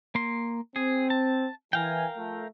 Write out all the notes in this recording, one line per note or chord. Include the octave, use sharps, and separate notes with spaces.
A#3 C6
C4 G#4
A5
E3 A#4 F5 G5 G#5
F3 A3